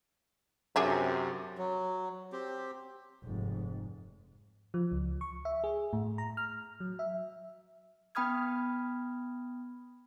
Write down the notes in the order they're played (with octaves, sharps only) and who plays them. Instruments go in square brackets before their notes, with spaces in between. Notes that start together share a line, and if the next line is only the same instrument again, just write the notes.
[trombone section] F#2 C3 [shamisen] D4 G#4 E5
[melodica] F#3
C4 G4
[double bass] F1 G#2
[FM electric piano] F3
C#2
C#6
E5
G#4
A2
A#5
F6
F#3
E5
[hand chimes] B3 G5 B5 D#6 F6 G#6